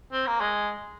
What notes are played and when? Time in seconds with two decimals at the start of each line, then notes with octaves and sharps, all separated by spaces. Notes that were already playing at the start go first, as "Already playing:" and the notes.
0.13 C4
0.27 A#3
0.41 G#3